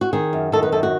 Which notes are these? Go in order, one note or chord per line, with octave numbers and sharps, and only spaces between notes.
F#4
D#3 G#4
F#2
D#3 A4
B4
F#2 A4
F#4